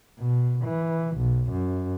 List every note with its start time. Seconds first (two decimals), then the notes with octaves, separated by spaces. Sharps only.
0.19 B2
0.64 E3
1.17 B1
1.51 F#2